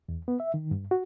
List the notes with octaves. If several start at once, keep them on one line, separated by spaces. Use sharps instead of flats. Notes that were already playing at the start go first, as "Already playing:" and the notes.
E2
B3
E5
D#3
G2
F#4